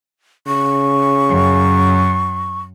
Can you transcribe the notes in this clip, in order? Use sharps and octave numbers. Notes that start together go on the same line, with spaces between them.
C#3 C#6
F#2